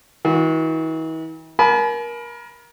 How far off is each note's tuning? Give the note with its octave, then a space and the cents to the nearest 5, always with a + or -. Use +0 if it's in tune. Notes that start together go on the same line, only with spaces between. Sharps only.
E3 -45 F#4 -35
A#4 +25 G#5 +45 B5 +0